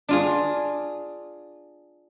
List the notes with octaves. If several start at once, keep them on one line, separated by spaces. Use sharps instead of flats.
D4 F4 G#4